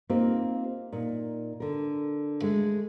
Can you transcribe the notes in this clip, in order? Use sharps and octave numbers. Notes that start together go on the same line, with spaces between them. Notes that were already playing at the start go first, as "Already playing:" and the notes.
A#3 C4 D#4 F4 G4
A#2 D#4
D3 A#4
G#3 A3